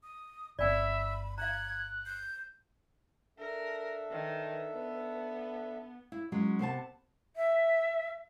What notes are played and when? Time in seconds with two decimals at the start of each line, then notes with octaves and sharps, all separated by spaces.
0.03 D#6
0.59 G1 C4 D5 E5 G#5 B5
1.38 F5 A#5 F#6 G#6
2.06 G6
3.39 D4 A4 A#4 E5
4.11 D#3 B4
4.73 B3
6.12 E4
6.32 F#3 G#3 C#4
6.59 C3 B3 C5 A5
7.36 E5